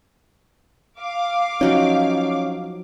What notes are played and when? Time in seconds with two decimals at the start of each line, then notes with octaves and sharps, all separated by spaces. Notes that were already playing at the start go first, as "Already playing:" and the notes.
1.00 F5 D6
1.61 F3 F#3 C#4 D#4